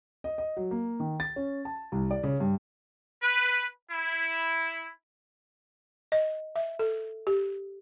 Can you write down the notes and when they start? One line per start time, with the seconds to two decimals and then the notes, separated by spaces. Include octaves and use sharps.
0.24 D#5
0.38 D#5
0.57 F#3
0.71 A#3
1.00 D#3
1.20 A6
1.36 C#4
1.65 A5
1.92 C2
2.11 D5
2.23 C#3
2.40 G2
3.22 B4
3.91 E4
6.12 D#5
6.56 E5
6.79 A4
7.27 G4